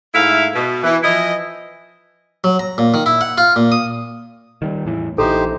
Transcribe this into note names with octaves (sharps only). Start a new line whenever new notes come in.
G#2 A3 E4 E5 F5
B2
E3
E3 F3 E4 D#5
F#3
A#5
A#2
D#3
E4
F#5
F4
A#2
D#6
D#3 F#3 G3
E2 A2 E3
A#1 E3 D#4 G4 A4 C5